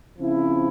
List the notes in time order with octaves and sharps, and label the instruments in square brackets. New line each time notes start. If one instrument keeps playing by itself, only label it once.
[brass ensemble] C#3 F3 C4 E4